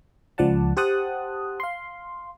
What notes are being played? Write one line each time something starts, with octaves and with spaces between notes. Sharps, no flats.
C#2 F3 D5 F#5 A5
G4 C5 F#5 A5 D#6 F#6
F5 C6